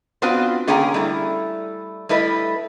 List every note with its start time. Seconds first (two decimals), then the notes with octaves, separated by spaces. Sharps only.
0.22 B3 C4 D4 F4 F#4 B4
0.67 D3 A#3 C#4 G#4 G5 A#5
0.94 G3 A3 E4
2.09 G3 A3 E4 B4 D#5